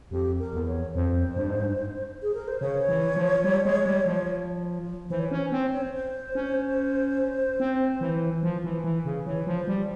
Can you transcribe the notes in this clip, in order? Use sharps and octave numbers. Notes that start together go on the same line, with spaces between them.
F2 G4
A#4
E2
C#5
F2 C5
G2
G#2
G2
G#4
A#4
C5
C#3 C#5
E3
F3
G3
G#3
G3
F3
E3 C5
C#5
C#4 C5
C#5
C5
C4 C#5
C5
C#5
C5
C5
C#4
C4
E3
F3
E3
E3
C#3
E3 C#5
F3
C5
G3